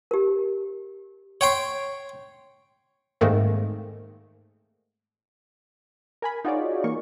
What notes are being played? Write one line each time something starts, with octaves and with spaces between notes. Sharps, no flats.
G4 A#4
C#5 G5 C6
G#2 D#3 A3 A#3 C4
A#4 G#5 B5
D#4 F4 F#4 G#4 C#5 D5
E3 A#3 C#6